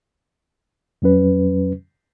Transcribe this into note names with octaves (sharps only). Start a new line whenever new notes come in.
F2 F#3 C#4 B4